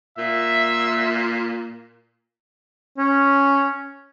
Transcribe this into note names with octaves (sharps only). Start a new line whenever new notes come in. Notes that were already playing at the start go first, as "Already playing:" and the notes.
A#2 E5
C#4